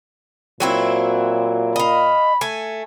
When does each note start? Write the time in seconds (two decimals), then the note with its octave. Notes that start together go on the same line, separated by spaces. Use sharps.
0.60 A#2 F#3 C4 E4
1.76 D#5 F5 B5
2.41 A3 G#5